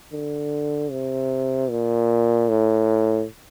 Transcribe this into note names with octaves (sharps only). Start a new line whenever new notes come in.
D3
C3
A#2
A2